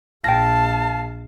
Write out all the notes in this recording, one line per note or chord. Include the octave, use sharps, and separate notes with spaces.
A#1 F5 G5 A5 A#6